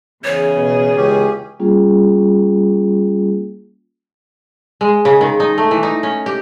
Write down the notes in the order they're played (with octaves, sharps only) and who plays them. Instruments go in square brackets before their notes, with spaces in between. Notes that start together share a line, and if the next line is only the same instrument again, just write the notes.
[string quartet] E2 C#3 G#4 [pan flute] C#5
[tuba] B2
[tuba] C#2 [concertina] C#4 G4
[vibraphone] G3 A#3 C#4 F4 G#4
[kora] G#3
C#3
D#3
D#4
A3
E3
D#4
C#4
G4